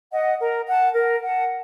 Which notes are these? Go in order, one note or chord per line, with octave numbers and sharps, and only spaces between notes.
D#5 F#5
A#4
F#5 A5
A#4
F#5 A5